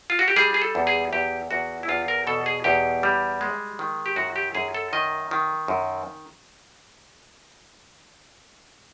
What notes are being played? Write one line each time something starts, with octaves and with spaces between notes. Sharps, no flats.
F4
F#4
G4
G3 G#4
G#4
A4
E2
G#4
E2 G4
E2 F#4
E4
E2 F4
A#4
B2 A4
G#4
E2 G4
G3
G#3
D#3
G4
F#2 F#4
G4
F#2 G#4
A4
D#3 D#5
D#3
F#2